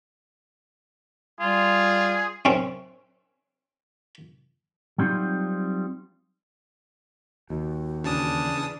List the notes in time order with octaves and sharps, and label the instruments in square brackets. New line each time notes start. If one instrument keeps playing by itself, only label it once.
[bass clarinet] G3 [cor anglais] F4 [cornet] G#4
[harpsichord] F#2 C4 C#4
[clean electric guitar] F#3 G3 C4 D#4 F4
[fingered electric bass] D#2 [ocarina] F#4
[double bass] E2 D4 [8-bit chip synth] C#3 A5 D#6